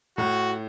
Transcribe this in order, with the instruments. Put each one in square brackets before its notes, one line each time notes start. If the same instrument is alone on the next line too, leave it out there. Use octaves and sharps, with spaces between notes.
[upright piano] A2 [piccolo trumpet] F#4